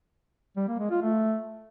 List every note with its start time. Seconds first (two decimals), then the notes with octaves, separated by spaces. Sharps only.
0.56 G3
0.68 A#3
0.79 G#3
0.91 F4
1.02 A3